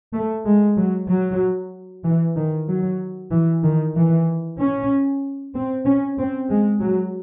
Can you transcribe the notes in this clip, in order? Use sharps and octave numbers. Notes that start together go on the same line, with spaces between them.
A3
G#3
F#3
F#3
E3
D#3
F#3
E3
D#3
E3
C#4
C4
C#4
C4
G#3
F#3